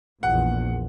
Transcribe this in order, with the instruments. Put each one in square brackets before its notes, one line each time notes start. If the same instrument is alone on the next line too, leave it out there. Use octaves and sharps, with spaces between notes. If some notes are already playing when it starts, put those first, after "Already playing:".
[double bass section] A#1 E2 A#2 [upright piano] F#5